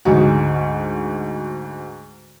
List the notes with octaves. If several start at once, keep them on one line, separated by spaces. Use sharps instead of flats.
D2 G#2 F#4